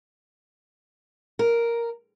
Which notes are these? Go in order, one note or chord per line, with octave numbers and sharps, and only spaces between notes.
A#4